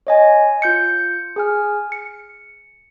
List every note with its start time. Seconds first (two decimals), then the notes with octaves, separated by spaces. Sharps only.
0.07 C#5 D#5 G#5
0.62 F4 G6 C#7
1.36 G#4 G#5 F6
1.92 C#7